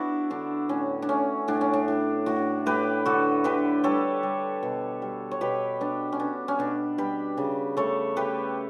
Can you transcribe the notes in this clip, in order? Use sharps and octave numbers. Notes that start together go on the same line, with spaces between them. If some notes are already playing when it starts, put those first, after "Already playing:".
Already playing: B3 D4 E4 F#4
D3 D4
A2 C#4
D4
A2 C#4
A2 D4
C#4
D4
A2
A2 D4 F#4
A2 G4 B4
D3 F#4 A4
D3 G4 B4
G3 A4 C#5
G3
B2
G3
C#5
B2 G4 B4
B3 D4
C#4
B3 D4
C#4
B2 D4
G3 G4 B4
C#3
A3 A4 C#5
A3 G4 B4